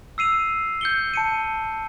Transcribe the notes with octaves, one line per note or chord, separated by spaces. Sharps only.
E6 C7 D#7 F7
G6 C#7 G7
A5 C#7 D#7